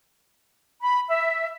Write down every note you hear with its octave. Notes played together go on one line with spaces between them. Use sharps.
B5
E5